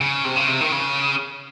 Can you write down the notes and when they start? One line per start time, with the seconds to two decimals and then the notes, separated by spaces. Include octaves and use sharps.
0.01 C#3
0.25 C3
0.36 C#3
0.48 C3
0.61 D#3
0.72 C#3